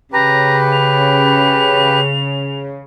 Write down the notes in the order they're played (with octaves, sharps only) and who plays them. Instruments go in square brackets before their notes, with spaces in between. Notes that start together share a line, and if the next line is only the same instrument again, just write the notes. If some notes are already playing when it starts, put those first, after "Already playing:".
[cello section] C#3 [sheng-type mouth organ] G4 B4 [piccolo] A#5
[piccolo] F7